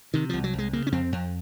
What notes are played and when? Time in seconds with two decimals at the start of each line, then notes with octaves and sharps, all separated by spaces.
0.14 C3 D#3
0.29 C2 F3
0.44 F#3
0.53 C2
0.58 G#3
0.73 C#3 A#3
0.87 C#4
0.92 F2 C4
1.12 F2